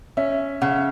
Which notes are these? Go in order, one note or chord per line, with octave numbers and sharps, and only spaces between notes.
C#4 E5
C#3 F#5